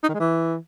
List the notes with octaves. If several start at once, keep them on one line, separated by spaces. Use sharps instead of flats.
D#4
D#3
G#3
E3